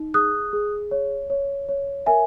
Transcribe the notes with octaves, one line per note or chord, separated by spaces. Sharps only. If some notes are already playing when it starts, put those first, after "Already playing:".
Already playing: D#4
G#4 D#6 F#6
G#4
C#5
C#5
C#5
A#4 E5 G#5